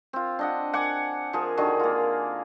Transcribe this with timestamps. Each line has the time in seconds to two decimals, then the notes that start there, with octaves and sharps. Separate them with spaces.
0.13 C4 F4
0.39 D4 D#5 F#5
0.73 F#5 G#5 D6
1.33 F3 G#4 A#4
1.57 D3 D#3 F#4 G#4
1.79 A#3 F4